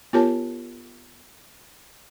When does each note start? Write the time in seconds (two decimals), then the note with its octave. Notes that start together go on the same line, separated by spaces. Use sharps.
0.13 B3 F4 G4 A#4 C#5 A5